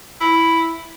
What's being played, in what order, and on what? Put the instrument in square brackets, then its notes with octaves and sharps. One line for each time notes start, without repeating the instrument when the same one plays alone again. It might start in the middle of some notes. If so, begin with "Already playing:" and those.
[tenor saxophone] E4